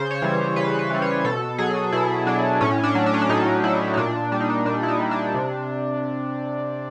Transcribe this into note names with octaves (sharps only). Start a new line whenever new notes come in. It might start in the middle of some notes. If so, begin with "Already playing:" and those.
Already playing: C#3 C5
C#5
E3 G3
C#3 B4
B4
E3 G3
C#5
B2 A4
F#3 G#4
B2 E4
F#3 D4
A2 C#4
D4
F#3
D4
C#4
D4
A2 D#4
F#3 E4
D#4
A#2 D4
G3 D4
D#4
D4
A#2 D4
E4
D#4
G3
D4
C3